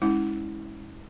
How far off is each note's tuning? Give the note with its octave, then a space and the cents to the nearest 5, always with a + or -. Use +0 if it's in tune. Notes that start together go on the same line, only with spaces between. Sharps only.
G#3 +0 C#4 +0 E4 -30